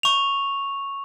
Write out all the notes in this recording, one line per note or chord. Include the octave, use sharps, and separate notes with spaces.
C#6 F7